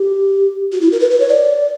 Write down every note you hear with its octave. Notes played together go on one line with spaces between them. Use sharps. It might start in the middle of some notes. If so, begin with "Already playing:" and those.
Already playing: G4
F#4
E4
A#4
B4
B4
C#5
D5